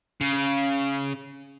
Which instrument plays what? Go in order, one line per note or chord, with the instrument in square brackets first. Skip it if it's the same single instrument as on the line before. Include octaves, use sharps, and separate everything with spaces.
[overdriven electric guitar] C#3